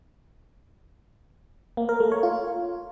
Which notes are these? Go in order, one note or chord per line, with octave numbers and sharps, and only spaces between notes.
A#3
A#4
A3
C#5
F4